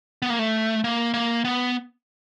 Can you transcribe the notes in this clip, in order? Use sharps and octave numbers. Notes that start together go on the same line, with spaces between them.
B3
A#3
A3
A#3
A#3
B3